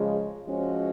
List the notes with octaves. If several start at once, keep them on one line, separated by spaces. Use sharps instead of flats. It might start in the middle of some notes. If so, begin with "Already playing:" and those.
Already playing: C#3 F3 G#3
F3 G#3 C#4 F#4